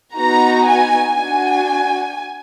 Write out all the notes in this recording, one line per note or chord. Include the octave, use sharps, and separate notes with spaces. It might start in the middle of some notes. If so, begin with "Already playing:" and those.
B3 D#4 F#4 A#5
G#5
D4 F#4 G#5